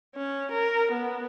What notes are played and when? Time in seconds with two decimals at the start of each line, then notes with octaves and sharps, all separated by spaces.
0.15 C#4
0.52 A#4
0.92 B3